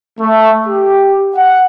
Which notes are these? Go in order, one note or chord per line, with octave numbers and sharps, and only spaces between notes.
A3
G4
F#5